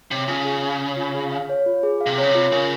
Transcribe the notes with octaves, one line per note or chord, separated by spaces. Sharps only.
C3 C#5
C#3 F4
G#4
F5
C#5
F4
G#4
F5
C#5
F4
G#4
F5
C3
C#3 C#5
C3
F4
C#3 A#4